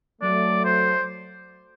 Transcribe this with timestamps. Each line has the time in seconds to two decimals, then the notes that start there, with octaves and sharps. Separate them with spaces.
0.22 F#3 A3 D5
0.65 C5